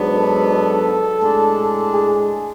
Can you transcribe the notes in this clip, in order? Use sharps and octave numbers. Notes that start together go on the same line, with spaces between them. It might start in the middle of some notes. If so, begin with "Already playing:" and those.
Already playing: G#2 F#3 B3 D4
A4
A2 G#3 D4
G#4